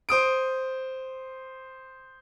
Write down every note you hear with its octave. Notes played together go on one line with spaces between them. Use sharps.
C5 D#6 D7